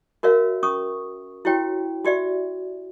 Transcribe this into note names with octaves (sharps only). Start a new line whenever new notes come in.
F#4 A#4 C#5 E5 F5
C#4 C#6 D#6
E4 F#4 G4 C#5 G5
F#4 G4 D5 E5